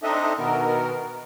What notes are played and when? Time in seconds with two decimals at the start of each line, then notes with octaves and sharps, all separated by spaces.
0.03 C4 D4 D#4 A4 D#5 E5
0.38 B2 D#3 B3 A#4